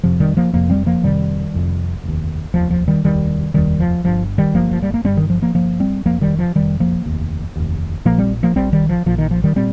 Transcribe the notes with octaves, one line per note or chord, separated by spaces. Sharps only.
F1 F2 C3 F3
D#3 G3
F3 A#3
F1 F2 C3 F3 A#3
G3 C4
F3 A#3
F1 F2 C3 D#3 G3
F1 F2 C3
F1 D#2
F1 D#2 F3
F3
D#3 G3
F1 D#2 D#3 G3
F1 D#2 D#3 G3
F3
G1 G2 F3
D#3 G3
G1 G2 F3 A#3
F3
G3
A#3
G1 G2 G3 C4
D#3
F3
F3 A#3
G1 G2 F3 A#3
G3 C4
F1 D#2 F3 A#3
D#3 G3
F3
F1 D#2 D#3 G3
F3 A#3
F1 D#2
F1 D#2
A#1 A#2 F3 A#3
G3 C4
F3 A#3
A#1 A#2 G3 C4
D#3 G3
F3
A#1 A#2 F3
D#3
F3
D#3 G3
A#2 G3 C4